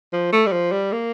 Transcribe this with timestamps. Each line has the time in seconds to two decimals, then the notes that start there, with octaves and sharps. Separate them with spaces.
0.13 F3
0.32 A3
0.46 G3
0.52 F3
0.72 G3
0.92 A#3